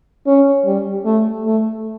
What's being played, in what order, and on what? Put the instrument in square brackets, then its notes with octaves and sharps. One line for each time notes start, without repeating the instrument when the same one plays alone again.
[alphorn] C#4
G3
A3
A3